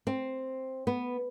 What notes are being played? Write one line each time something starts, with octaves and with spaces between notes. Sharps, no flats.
C4
B3